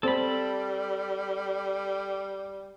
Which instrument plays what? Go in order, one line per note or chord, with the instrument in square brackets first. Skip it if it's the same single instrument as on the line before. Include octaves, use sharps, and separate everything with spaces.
[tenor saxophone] G3 [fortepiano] C4 [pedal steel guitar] A4 B5